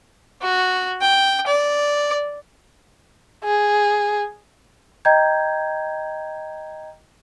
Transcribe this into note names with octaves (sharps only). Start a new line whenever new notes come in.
F#4
G5
D5
G#4
D#5 G5 A#5 G6 G#6